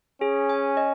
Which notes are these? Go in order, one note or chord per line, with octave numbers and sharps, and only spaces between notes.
C#4 G#4
G#5
D#5